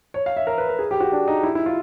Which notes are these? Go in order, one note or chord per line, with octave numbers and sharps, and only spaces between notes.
C#5
F5
E5
A#4
B4
A#4
G#4
G4
F#4
D4
D#4
E4
E4
F4